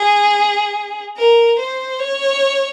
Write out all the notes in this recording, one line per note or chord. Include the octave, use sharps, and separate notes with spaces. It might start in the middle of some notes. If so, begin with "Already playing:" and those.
Already playing: G#4
A#4
C5
C#5